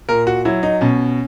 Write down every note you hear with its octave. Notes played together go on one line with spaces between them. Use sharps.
A#2 A#4
F#4
F#3 E4
D#4
B2 C#4